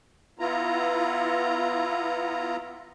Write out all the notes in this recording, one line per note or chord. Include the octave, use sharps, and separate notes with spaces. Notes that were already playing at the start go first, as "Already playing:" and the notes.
B3 E4 F4 A#5